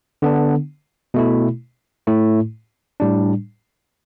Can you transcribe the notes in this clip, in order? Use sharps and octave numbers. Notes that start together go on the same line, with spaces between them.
D3 B3 D4
B2 A3 E4
A2 A3 E4
A2 G3 D4